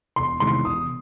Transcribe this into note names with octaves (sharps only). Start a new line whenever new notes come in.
E1 C6
E2 C3 D#3 G#3 C6
E1 D#6